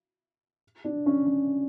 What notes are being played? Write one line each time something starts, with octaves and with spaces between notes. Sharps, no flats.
D4
C#4
C#4